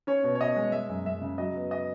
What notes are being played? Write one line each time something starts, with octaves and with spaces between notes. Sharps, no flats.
C#4 C#5
B2
C#5
B2 D#5
G#3
G#3 E5
F#2
F#2 E5
C#3
F#3 D#5
B3
D#5